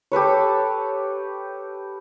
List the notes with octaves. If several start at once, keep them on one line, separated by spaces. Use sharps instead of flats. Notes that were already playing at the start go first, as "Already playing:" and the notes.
G4 A4 B4 C#5